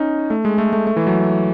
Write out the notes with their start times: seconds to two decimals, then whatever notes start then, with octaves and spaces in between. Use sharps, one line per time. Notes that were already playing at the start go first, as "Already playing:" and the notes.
Already playing: C#4 D#4
0.30 A3
0.45 G#3
0.58 A3
0.73 A3
0.87 A3
0.96 E3
1.07 F#3